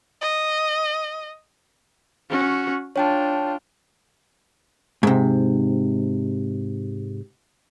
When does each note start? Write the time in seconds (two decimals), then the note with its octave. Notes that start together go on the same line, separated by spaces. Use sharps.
0.21 D#5
2.29 C#4 F#4
2.96 D4 F4 C#5 G5 A5
5.03 G#2 C3